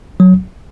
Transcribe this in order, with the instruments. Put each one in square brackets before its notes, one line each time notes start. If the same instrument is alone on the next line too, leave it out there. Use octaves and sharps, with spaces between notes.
[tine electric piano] F#3